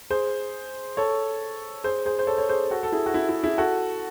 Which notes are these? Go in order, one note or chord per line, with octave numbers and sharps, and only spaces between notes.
G#4 C5
A4 C#5
G#4 C5
G#4 C5
C5
A4 C#5
C#5
G#4 C5
F#4 A4
A4
E4 G#4
F#4
E4
E4
E4 G#4
F#4 A4